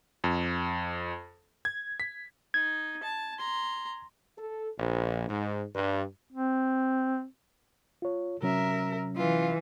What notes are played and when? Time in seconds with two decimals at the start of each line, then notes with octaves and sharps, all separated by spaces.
0.24 F2
1.65 G#6
2.00 B6
2.54 D#4 G#6
3.03 A5
3.39 A#5 C6
4.38 A4
4.78 A#1
5.28 G#2
5.75 G2
6.33 C4
8.02 F4 C#5
8.42 C3 F#3 C#4 A#4 E5
9.17 E3 F4